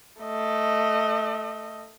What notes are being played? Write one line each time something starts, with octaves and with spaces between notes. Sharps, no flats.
A3 D#5